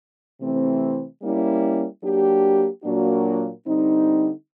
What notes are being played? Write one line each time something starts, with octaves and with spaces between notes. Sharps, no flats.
C3 E3 A3 C4
G3 A#3 C#4 E4
F#3 A#3 D4 G4
A#2 F#3 A#3 D4 F#4
D3 G3 C4 D#4